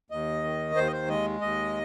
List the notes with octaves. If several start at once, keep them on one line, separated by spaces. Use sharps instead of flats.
D#2 D#5
D#3
D#2 C5
D#5
C5
G#3 D#5
D#2 D#5